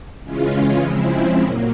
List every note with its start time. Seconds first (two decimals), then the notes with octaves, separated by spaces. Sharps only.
0.23 C#3 E3 G#3 C#4 F4
0.83 C#3 F3 G#3 C4 E4
1.41 A#2 F#3 A#3